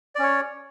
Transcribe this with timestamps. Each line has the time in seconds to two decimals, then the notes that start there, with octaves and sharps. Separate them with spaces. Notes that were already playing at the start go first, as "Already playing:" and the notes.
0.15 D5
0.19 C#4
0.23 C#5